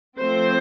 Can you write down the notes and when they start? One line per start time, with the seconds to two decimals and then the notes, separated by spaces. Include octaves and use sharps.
0.19 F3 A3 C4 C5